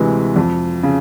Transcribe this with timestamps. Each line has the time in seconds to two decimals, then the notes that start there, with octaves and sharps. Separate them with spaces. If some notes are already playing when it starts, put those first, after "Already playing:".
Already playing: D2 C3 E3 G#3
0.36 F2
0.83 C#3